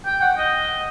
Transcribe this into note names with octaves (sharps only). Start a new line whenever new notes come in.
G5
F#5
D#5